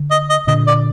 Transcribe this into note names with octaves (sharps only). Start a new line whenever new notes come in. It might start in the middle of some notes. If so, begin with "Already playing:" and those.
Already playing: D3
D#5
D#5
A#2 D3 D#5
D5